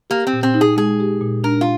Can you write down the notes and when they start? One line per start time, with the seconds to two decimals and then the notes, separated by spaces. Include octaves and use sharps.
0.10 A#3 G4
0.27 C4
0.33 A#2
0.43 C4
0.54 D#4
0.61 G#4
0.77 G#3 G#4
1.00 G4
1.21 A#2
1.44 D4 A#4
1.61 F4